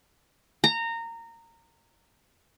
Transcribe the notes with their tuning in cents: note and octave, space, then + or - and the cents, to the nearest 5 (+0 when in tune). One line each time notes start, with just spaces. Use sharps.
A#5 -20